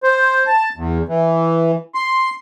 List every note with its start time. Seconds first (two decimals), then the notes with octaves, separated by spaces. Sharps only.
0.03 C5
0.47 A5
0.76 E2
1.08 E3
1.95 C6